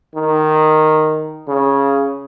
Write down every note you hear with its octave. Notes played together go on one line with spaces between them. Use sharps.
D#3
C#3